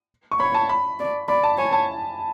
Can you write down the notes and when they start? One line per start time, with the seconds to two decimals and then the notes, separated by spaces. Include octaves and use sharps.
0.31 C#6
0.40 C#5 B5
0.54 A5
0.69 B5
0.99 D5
1.28 D5 B5
1.43 A5
1.58 C#5 G#5
1.73 A5